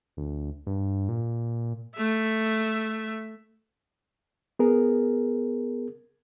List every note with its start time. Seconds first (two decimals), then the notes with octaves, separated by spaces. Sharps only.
0.17 D2
0.67 G2
1.09 A#2
1.96 A3 E5
4.59 B3 G#4 A#4